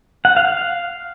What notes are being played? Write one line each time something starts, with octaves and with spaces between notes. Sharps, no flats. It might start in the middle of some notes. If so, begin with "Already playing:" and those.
F#5
F5
F5